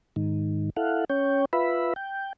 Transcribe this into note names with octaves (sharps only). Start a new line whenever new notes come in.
G#2 D#3
E4 A4 F5 F#5
C#4 C#5 G5
F4 B4 E5 B5
G5